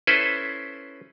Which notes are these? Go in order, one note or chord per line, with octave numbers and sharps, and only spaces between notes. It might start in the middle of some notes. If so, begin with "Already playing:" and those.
C#4 E4 A4 B4 C5